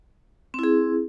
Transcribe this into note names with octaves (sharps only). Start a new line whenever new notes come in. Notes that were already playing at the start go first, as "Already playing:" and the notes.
C4 E4 G#4